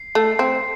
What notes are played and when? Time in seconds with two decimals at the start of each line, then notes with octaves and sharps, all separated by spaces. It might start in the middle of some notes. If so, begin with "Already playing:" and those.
Already playing: C7
0.15 A3
0.39 C4